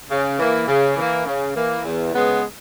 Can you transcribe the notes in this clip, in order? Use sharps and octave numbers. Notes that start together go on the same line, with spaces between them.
C#3
E3 A#3
C#3
E3 A#3
C#3
E3 A#3
E2
C#3 G#3 B3